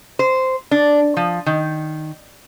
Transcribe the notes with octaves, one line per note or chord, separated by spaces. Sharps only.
C5
D4
F3
D#3